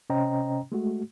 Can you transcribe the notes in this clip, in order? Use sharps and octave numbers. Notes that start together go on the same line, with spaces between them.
C3 C#4 C5 D#5 G5 A#5
G#3 A3 F#4